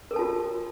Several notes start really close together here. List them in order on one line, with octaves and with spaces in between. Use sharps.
A#4 A4 A5 F4 F#4